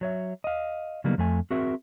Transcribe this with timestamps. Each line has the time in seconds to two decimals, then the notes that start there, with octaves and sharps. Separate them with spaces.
0.01 F#3 C#5 E5
0.44 D#5 F5
1.04 C#3 F#3 G3 A#3 B3 D#4
1.18 F2 A3 G#5
1.50 C4 F#4 G#4 A#4 E5